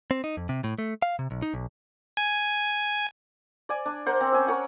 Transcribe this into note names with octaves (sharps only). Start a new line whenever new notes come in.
C4
D#4
F2
C3
A2
A3
F5
C3
B1
D#4
B1
G#5
D5 G#5
D4
A#4 C5 F#5
C4
C#4 G#5 E6
A#4 C#5 F#5